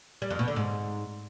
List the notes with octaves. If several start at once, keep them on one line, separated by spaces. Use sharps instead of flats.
G3
F2
B2
D3
G#2